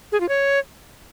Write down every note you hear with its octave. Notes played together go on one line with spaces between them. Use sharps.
G#4
F4
C#5